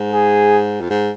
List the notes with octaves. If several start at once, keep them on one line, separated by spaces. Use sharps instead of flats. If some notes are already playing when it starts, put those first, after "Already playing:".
Already playing: G#2
G#4
F2
G#2